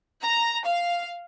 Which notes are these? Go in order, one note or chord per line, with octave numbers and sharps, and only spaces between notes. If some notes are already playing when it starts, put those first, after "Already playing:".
A#5
F5